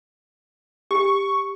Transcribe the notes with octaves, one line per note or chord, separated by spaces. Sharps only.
G4 C#6